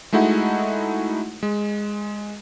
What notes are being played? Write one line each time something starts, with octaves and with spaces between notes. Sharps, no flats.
G#3 A3 D#4 E4 F#4 F#5
G#3